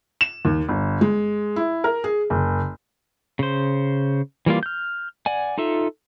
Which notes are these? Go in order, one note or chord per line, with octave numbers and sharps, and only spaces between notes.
E7
D#2
G1
G#3
E4
A#4
G#4
F#1
C#3 C5
E3 G3 A#3 F4
F6 G6
D5 F#5 G#5
D#4 F4 A4 E5